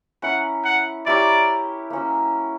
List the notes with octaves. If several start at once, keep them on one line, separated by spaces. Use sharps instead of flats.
C#4 E4 A#4 F#5
F#5
E4 G4 A#4 C#5 D5
A#3 C#4 F#4